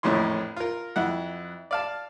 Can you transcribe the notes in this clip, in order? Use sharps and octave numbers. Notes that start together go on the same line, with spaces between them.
A#1 F2 A2 E3 C#4 C6
F4 A#4
F2 E4 F#5
D5 F5 A5